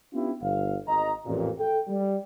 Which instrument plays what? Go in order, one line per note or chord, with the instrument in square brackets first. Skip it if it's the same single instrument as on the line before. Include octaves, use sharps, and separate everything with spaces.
[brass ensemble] B3 C#4 D4 E4 F4 G4
G1 F5
G#1 D#5 A#5
A1 F2 A#2
A4 G5
G3